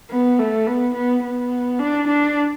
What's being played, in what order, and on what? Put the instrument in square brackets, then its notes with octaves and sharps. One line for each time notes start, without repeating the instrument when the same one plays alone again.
[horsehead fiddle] B3
A3
B3
B3
B3
D4
D4